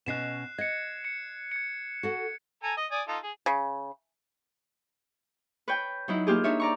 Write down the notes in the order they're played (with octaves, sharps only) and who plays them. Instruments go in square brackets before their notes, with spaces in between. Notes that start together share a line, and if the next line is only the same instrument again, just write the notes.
[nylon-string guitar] B2 C#4 D#5 [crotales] F#6 C7 E7
[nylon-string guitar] D#5 [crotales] G#6 C#7
[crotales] C#7
G#6 C#7
[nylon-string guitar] F#4 A4 F#5
[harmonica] A4 G#5 A#5
D#5
D5 G#5 D#6
D#4 F4 A4
G#4
[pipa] C#3
[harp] B4 C#5 G5
F#3 D#4 E4
A#3 F4 G4 G#4
D4 D#4 C#5 E5
D5 A#5 C#6